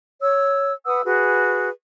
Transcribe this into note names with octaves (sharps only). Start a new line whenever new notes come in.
C#5 E6
B4 F#5 D#6 E6
F#4 G#4 B4